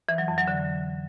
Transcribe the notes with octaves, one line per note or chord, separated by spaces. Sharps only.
E3
F#3
F2
F#3
D3